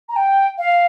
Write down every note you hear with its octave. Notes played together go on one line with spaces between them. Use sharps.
A#5
G5
F5